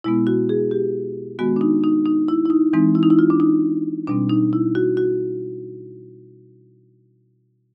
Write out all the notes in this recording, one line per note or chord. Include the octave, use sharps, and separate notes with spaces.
B2 G#3 B3 E4
F#4
G#4
G4
D#3 G#3 B3 F#4
D4
D#4
D#4
D#4
E4
E4
D#4
E3 G#3 C4 D#4
E4
D#4
E4
F4
D4
D#4
B2 G3 C4 D4
D#4
E4
F#4
F#4